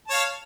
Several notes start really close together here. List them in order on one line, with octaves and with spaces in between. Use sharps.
A5 C#5 F5